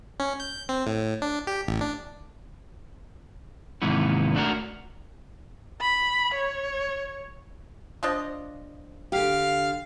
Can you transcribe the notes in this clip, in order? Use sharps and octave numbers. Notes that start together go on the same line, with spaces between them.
C#4
G6
C4
A2
D4
G4
A1
D4
D#2 G#2 C3 E3 B3
A3 D4 F#4 A#4
B5
C#5
F3 D4 D#5
D3 G4 F5